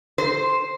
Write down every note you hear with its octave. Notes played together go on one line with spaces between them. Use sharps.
C5